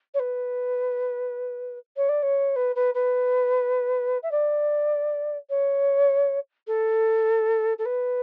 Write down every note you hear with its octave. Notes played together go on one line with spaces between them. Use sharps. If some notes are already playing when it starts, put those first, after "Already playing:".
C#5
B4
C#5
D5
C#5
B4
B4
B4
E5
D5
C#5
A4
A4
B4